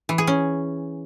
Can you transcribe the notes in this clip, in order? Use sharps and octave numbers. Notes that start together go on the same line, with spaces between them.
E3
G#4
C#4